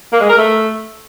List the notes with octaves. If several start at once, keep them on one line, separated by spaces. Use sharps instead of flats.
A#3
G#3
A#4
A3